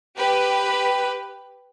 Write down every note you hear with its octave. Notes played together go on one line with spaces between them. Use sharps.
G4 B4